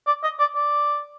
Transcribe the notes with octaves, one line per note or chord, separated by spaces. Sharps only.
D5
D#5
D5
D5